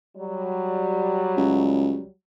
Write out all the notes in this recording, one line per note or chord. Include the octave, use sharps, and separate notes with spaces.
F#3 G3
C#2